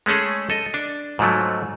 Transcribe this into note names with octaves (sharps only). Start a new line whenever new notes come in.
G#3 A3 C#4 G#4 A4
A4 D#5
D4
G#2 F3 F#3 A3